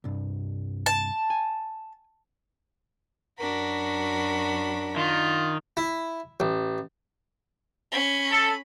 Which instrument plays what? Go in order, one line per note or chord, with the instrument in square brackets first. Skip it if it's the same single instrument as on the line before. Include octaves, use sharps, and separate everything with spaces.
[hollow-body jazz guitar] C2 G2
[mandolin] A5
[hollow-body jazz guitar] G#5
[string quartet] F#2 F#4 B5 [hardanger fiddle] D4 A#4
[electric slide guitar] D#3 [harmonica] F4
[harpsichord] E4
A1
[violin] C#4 B5
[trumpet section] A4